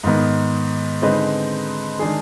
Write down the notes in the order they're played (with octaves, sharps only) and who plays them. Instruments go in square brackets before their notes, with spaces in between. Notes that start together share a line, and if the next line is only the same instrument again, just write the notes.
[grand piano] G#2 D#3 B3
D3 G#3 C4 D#4 B4
D#3 G#3 D4 G#4